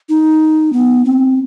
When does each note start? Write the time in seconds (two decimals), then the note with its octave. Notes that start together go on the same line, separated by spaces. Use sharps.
0.09 D#4
0.73 B3
1.05 C4